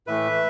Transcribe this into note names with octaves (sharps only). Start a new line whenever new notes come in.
A2 E3 A3 B4 E5